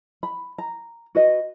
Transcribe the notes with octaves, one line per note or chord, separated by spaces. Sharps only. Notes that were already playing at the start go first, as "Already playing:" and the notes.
B5
A#5
F#4 B4 D#5